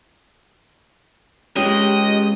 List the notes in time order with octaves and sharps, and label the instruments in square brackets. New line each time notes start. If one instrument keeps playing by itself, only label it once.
[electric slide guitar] G#3 C#4 [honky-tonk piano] G4 [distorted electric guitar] D#5